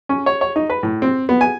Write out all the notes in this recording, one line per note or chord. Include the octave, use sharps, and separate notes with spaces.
C#4
C#5
C#5
D#4
B4
A2
C4
B3
G#5